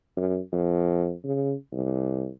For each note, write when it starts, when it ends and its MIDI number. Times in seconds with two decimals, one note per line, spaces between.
0.17 0.39 42
0.53 1.13 41
1.25 1.54 49
1.73 2.29 36